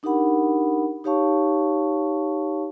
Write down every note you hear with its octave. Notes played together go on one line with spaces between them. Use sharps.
D4 D#4 G4 A#4 F#5 B5
D#4 G4 C#5 F5 A5 C#6